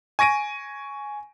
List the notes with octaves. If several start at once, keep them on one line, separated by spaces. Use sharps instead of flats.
G#5 C#6 A#6 D7 D#7